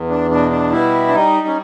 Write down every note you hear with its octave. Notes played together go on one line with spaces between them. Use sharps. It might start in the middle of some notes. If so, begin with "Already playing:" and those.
Already playing: E2
D4
B2 D4
D4
G3 E4
D4
G3 D#4
C#4